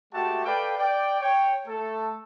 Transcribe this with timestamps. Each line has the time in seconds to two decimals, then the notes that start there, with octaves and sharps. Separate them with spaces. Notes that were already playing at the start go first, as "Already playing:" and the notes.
0.14 G#3 A3 F#4 G4 E5 A5
0.45 A4 B4 D5 F5 G5
0.78 D5 G5
1.21 C#5 G5
1.67 A3 A4